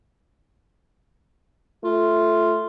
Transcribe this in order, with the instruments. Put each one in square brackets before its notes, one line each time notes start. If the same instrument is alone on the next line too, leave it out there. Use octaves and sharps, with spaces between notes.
[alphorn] A3 [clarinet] F4